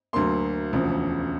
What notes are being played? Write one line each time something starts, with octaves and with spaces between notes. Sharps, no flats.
D2 D3 F#3 A#3 C6
E1 D2 C#3 F3